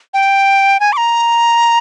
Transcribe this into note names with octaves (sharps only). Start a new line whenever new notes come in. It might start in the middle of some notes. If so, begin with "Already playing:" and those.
G5
G#5
D6
A#5